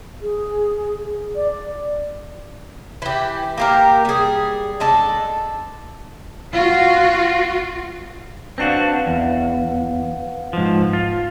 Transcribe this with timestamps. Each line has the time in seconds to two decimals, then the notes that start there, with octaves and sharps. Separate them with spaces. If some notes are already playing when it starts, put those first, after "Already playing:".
0.21 G#4
1.35 D5
3.02 E3 G4
3.58 A#3 G4 A#4
4.05 G3 G#4
4.80 G#3 D4 A4
6.52 F4 F#4
8.58 C4 D4 F#4 B4 F5 F#5
9.07 E2
10.53 G#2 F3
10.93 F4